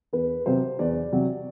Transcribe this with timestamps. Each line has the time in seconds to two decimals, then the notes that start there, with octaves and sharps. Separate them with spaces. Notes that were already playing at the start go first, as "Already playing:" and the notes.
0.13 E2 B4
0.46 C3 F#3 C5
0.79 E2 D5
1.12 C3 F#3